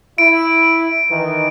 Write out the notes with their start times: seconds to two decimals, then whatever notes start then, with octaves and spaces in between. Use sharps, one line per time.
0.18 E4 D7
1.09 D#3 E3